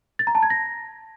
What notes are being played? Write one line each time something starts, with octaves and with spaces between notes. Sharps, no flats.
A6
A#5
A5
G#6
A#6